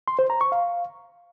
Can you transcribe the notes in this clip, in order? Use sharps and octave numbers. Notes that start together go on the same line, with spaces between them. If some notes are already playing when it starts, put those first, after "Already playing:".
C6
C5
A#5
C#6
F5